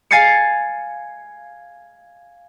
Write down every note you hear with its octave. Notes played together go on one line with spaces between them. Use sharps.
F5 G#5 G#6 A6 C7 C#7